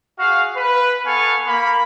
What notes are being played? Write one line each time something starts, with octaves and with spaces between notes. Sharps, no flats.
F#4 G#4 F5
B4
B3 A4 F5 G#5 C#6
A#3 B5